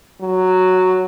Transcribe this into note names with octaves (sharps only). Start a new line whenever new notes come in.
F#3